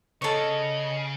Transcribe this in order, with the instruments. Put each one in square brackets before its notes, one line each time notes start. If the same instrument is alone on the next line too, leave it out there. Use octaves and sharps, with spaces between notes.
[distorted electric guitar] C#3 [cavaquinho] A4 C#5 [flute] D#5